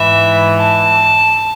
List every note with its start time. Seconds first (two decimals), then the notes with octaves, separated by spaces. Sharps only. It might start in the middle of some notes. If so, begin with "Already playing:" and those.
Already playing: G#2 E3 E5
0.60 A5